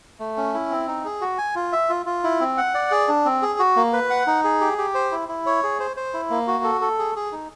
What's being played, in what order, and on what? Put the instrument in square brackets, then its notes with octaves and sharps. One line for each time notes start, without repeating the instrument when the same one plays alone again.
[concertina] A3
C#4
E4
C4
D#4
G#4
F#4
G#5
F4
E5
F4
F4
E4
C4
F#5
D5
G#4
D4
C4
G#4
F#4
A#3
B4
F#5
D#4
G#4
G4
G4
C5
E4
E4
C#5
G#4
C5
C5
E4
A#3
F#4
A4
A4
G#4
G#4
D#4